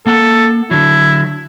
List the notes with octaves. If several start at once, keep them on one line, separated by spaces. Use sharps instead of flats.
A#3 A4 F#5
D3 F#3 E4